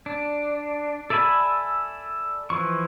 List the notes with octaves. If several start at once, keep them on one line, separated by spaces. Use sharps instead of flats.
D4
A4 D5 E5 G#5 B5
E3 F3 C#6